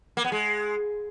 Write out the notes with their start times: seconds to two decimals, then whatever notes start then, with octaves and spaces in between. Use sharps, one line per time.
0.17 A#3
0.24 B3
0.32 G#3